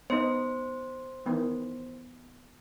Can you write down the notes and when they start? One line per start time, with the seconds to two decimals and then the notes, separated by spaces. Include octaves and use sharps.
0.10 B3 D#4 C5
1.26 D#3 E3 B3